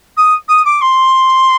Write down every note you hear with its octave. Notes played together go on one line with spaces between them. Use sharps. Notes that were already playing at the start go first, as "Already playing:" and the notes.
D#6
D#6
D6
C6